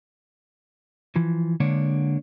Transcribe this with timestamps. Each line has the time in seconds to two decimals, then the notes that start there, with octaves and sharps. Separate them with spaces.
1.16 E3 F3
1.60 D3 G#3 A#3 D4 C#5